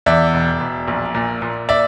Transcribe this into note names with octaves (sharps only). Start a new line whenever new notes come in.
E2 D5 E5
E1
E1
A#1
A#2
A#2
D5 E5